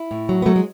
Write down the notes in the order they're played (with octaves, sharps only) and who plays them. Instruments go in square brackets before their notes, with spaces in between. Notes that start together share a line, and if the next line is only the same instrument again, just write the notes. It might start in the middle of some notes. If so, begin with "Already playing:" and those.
Already playing: [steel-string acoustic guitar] E4
A2
F#3
B3
F#3 A3
G#3